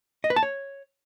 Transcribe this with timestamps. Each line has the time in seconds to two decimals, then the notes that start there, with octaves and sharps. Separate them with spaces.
0.24 D#5
0.30 B4
0.36 A5
0.43 C#5